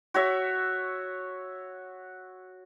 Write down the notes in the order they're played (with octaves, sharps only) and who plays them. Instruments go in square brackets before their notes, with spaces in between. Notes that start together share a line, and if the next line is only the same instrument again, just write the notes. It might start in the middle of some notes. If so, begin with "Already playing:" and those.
[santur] F#4 C#5 E5